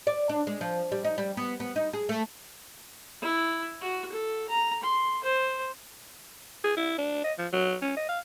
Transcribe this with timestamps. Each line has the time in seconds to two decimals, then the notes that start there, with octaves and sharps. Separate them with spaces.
0.07 D5
0.29 D4
0.47 G#3
0.61 F3
0.92 G3
1.04 D#4
1.18 G3
1.37 B3
1.60 B3
1.76 D#4
1.93 G#4
2.09 A3
3.22 E4
3.81 F#4
4.12 A4
4.49 A#5
4.83 C6
5.23 C5
6.64 G#4
6.77 E4
6.98 D4
7.24 D#5
7.38 F3
7.53 F#3
7.82 C#4
7.97 D#5
8.09 F5